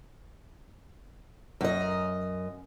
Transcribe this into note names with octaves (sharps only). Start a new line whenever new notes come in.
F#2 D#5